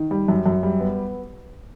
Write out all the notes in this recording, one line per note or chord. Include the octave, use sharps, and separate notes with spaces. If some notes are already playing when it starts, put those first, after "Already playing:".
Already playing: D#3
G3
F#2
F#2
G3
B3